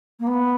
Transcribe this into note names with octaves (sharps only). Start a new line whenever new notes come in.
A#3
B3